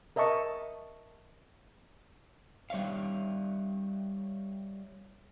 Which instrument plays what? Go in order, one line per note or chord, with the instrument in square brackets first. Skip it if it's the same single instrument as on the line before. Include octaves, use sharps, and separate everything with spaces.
[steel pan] A#4 D#5 E5 A5 C#6
[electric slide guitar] G3 C#5 E5 F5